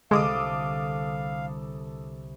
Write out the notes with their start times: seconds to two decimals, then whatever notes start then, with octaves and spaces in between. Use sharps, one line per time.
0.11 C2 D3 G#3 A4 F5 D6 D#6